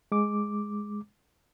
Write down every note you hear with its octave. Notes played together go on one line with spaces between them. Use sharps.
G#3 D6